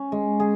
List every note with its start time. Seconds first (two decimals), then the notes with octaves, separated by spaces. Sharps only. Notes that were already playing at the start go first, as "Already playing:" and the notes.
Already playing: C#4
0.12 G#3
0.40 G#4